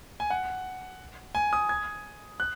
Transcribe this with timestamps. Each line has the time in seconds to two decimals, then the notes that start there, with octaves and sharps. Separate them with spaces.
0.20 G#5
0.30 F#5
1.35 G#5
1.53 D#6
1.69 G#6
2.40 F#6